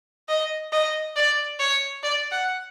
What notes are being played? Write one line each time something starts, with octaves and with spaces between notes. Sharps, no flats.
D#5
D#5
D5
C#5
D5
F#5